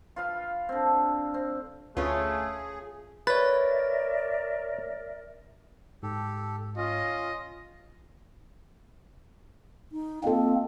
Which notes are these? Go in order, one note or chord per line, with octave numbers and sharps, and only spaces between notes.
F4 B4 F5
D3 C4
C4
D2 A3 C#4 F4 G#4 B4
A#4 B4 C#5 D5 E5 A6
G#2 G4 A4
C#4 F4 D#5
D#4
A#3 C4 F4 A4 D#5